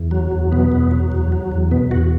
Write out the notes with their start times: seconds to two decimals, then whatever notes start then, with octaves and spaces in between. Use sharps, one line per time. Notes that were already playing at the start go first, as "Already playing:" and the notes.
Already playing: E2
0.11 F#3
0.31 E2
0.52 B2 B3
0.72 E2
0.91 F#3
1.12 E2
1.32 F#3
1.52 E2
1.71 B2 B3
1.91 E2 F#4